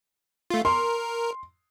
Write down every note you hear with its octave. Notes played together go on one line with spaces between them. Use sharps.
A3 F4
A#4 C6